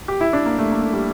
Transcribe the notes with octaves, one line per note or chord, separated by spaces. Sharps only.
G4
E4
D4
A#3
A3
A#3
A3
G3